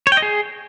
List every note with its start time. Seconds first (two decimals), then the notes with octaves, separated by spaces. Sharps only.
0.07 C#5
0.12 G5
0.17 D#5
0.22 G#4